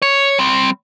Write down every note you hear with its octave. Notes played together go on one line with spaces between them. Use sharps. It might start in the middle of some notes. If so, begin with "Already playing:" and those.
C#5
G3 C4